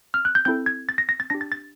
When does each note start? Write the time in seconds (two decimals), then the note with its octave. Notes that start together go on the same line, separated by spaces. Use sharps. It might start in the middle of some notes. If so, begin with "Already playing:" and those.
0.14 F6
0.25 F#6
0.35 G6
0.45 C4 E4 A4 G6
0.66 G#6
0.89 A6
0.98 A#6
1.09 A#6
1.20 A6
1.30 D4 G4 A#6
1.41 A6
1.52 A6